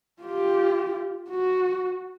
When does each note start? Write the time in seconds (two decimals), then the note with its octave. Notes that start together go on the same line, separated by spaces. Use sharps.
0.22 F4 G4
1.30 F#4